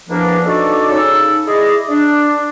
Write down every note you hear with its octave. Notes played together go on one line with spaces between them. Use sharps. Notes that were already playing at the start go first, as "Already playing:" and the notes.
E2 F3 A#3 D4
D4 D#4 F#4 A4 D5
C#3 D#4 A4 E6
E4 G#4 D5 D#5
D4